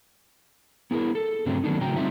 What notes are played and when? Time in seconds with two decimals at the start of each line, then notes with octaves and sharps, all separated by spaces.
0.91 B3 E4 G#4 A#4
1.15 A4
1.46 G2 C#3 F#3 A3 C4 D4
1.64 D#3 F#3 A3 B3 D4 D#4
1.81 A2 C#3 F#3 G5 A#5
1.96 G3 C4 D#4 F4 D#5 E5